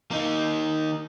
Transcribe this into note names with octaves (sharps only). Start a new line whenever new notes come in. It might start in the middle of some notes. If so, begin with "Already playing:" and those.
A#3 D#4